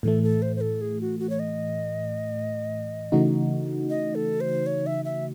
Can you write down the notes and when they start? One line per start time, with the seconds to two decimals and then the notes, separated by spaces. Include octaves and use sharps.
0.03 A2 E3 A3 A4
0.23 A4
0.42 C5
0.56 C5
0.61 A4
0.81 G#4
1.01 F#4
1.20 F#4
1.30 C#5
1.39 D#5
3.12 C#3 E3 A3 D#4 F#4
3.90 D#5
4.15 A4
4.41 C5
4.66 C#5
4.86 E5
5.05 E5